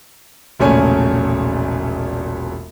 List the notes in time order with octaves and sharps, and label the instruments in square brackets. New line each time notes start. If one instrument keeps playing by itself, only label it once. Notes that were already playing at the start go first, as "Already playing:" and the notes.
[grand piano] E1 A#1 C#3 A3 C#5 G#5